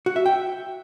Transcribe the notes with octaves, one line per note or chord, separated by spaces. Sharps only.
F#4
E5
G5